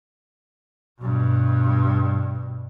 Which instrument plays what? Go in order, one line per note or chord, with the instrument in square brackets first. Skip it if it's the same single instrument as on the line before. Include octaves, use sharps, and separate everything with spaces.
[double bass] G2 B2